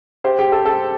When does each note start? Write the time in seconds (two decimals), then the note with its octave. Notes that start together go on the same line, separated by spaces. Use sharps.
0.24 G4 C5
0.39 G4
0.52 A4
0.65 A4